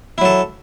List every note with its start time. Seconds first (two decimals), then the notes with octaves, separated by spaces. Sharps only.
0.18 E4
0.21 F#3
0.25 A4